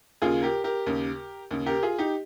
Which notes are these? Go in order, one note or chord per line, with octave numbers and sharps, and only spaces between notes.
D#2 C#3 F4 G#4
G4 A#4
G4 A#4
D#2 C#3
D#2 C#3
G4 A#4
F4 G#4
D#4 G4